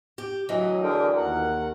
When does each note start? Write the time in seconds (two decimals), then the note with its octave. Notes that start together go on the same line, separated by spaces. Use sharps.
0.18 G4
0.49 D2 E3 F#3 D#5
0.82 D3 G#4 A#4 G5
1.15 D#2 A#4 F#5